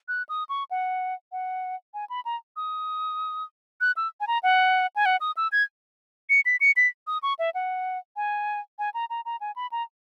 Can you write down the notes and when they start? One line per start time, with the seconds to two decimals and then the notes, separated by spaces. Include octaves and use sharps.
0.08 F#6
0.29 D#6
0.49 C#6
0.71 F#5
1.32 F#5
1.94 G#5
2.10 B5
2.25 A#5
2.56 D#6
3.81 F#6
3.97 E6
4.20 G#5
4.27 A#5
4.43 F#5
4.96 G#5
5.06 F#5
5.21 D#6
5.37 E6
5.52 G#6
6.30 C#7
6.46 B6
6.61 C#7
6.77 B6
7.07 D#6
7.23 C#6
7.39 E5
7.55 F#5
8.16 G#5
8.79 G#5
8.94 A#5
9.10 A#5
9.25 A#5
9.41 G#5
9.56 B5
9.72 A#5